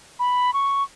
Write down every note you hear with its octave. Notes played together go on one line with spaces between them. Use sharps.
B5
C#6